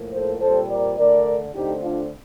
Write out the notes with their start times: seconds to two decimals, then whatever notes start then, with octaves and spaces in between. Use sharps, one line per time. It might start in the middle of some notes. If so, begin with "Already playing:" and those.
Already playing: A2 F3 A#3
0.13 A4 C5
0.41 A#2 G3 C4 A4 C5
0.70 A#4 D5
0.97 D3 A3 D4 A#4 D5
1.54 D3 A3 C4 D#4 G4
1.83 D4 F4